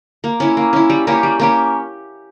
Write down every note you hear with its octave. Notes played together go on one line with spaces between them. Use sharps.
A#3
C#4 E4
A#3
C#4 E4
G3
A#3 C#4 G4
G3
A#3 C#4 G4